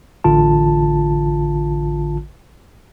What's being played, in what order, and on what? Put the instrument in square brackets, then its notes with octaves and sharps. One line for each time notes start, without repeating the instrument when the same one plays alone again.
[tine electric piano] A1 D3 F4 A5